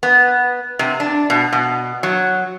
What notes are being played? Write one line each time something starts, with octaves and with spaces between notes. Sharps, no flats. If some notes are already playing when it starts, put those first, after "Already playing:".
B3
C3
D4
B2
B2
F#3